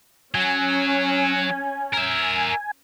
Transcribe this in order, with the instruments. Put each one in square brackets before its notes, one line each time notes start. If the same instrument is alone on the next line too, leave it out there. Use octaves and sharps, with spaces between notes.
[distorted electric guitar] F#3 [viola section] C#4 [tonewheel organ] G#5
[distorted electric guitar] A#4 E5